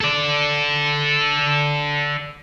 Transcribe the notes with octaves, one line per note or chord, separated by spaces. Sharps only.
A4 D5